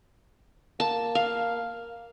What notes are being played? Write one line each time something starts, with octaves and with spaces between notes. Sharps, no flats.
A#3 A5
F5